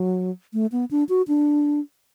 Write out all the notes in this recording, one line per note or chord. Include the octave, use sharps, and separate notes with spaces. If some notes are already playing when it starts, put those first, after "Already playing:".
Already playing: F#3
A3
B3
D4
F#4
D4